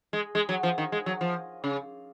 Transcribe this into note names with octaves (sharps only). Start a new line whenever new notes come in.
G#3
G#3
F#3
F3
D#3
G#3
F#3
F3
C#3